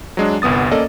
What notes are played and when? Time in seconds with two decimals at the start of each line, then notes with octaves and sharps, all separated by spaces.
0.17 F#3 G#3 D4
0.42 G1 C2 B3 D#6 A6
0.71 A#3 C#4 A4 D5 D#5